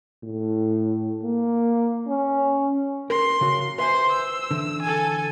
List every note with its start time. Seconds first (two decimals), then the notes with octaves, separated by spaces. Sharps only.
0.24 A2
1.24 A#3
2.08 C#4
3.10 A#4 C6
3.41 C#3 F#4 A#4
3.79 B4 C5 E5 G#5 C6
4.11 E6
4.51 D3 E3
4.82 A4 G#5